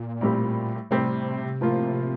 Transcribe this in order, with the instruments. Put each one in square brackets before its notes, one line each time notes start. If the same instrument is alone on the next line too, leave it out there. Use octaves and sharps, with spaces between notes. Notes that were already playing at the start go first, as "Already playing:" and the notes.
Already playing: [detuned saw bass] A#2
[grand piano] A2 G3 C4 G4
[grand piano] A2 G3 C4 G4 [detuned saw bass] C3
[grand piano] A2 F3 A#3 F4